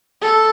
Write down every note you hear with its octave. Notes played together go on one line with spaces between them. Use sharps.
A4